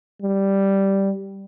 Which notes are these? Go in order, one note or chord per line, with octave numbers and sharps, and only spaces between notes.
G3